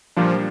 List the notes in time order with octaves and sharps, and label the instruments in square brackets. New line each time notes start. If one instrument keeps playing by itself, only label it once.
[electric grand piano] A#2 G3 A#3 D4 [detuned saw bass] F3